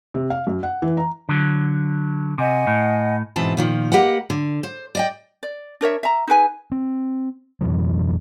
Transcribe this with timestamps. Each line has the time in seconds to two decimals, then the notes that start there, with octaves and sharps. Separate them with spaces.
0.14 C3
0.30 F5
0.47 F#2
0.63 F#5
0.82 E3
0.97 A#5
1.29 D3 F#3
2.38 C3 D#5 F#5 G#5
2.67 A2
3.36 G#2 B2 E3 C4 B4 A5
3.57 A#2 D#3 F3
3.92 A#3 G4 B4 D#5 F#5
4.30 D3
4.63 C5
4.95 D5 D#5 G5
5.43 D5
5.81 D4 A#4 C#5 E5
6.03 E5 A#5
6.27 D#4 G#4 B4 G#5
6.72 C4
7.61 F2 B2 E3 F#3